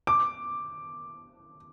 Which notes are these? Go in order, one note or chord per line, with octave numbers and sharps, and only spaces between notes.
D6